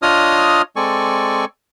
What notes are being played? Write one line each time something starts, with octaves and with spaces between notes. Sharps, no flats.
D4 F4 C#5 D#5 D#6 F6
G#3 C4 A4 D5 G#5 C#6